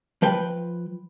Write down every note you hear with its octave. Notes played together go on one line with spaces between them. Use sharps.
F3 B4 G5